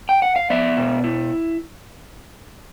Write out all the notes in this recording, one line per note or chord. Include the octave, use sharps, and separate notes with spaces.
G5
F#5
F5
B3 D5 E5
B2
E4